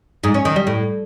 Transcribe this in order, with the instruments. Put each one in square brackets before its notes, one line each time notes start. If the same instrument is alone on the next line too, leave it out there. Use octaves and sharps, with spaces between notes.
[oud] G#2
C#4
D#3
G3
A2